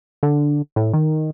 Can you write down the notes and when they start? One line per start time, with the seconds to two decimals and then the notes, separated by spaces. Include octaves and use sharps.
0.23 D3
0.76 A2
0.94 D#3